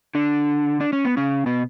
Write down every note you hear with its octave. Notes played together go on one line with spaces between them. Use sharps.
D3 D4
D4
C#4
B3
C#3 C#4
B2 B3